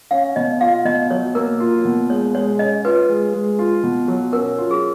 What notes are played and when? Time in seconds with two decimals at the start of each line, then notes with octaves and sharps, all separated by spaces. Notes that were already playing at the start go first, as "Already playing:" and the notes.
0.11 C#4 F5
0.36 B2 D#5
0.60 F4 F5
0.85 B2 D#5
1.11 F#3 C#5
1.35 A#3 A#4
1.60 F4
1.85 B2
2.10 G#3 C#5
2.35 G#3 C#5
2.59 C#4 D#5
2.85 F4 B4
3.09 G#3
3.34 G#3
3.59 F4
3.83 B2
4.08 F#3
4.33 C#4 A#4
4.58 F4
4.71 G#4